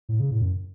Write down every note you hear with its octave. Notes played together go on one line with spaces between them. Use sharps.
A2
C#3
A2
F#2